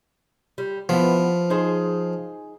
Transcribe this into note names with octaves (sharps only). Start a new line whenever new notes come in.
G3
F3 B3 E4
D#4 G#4 C5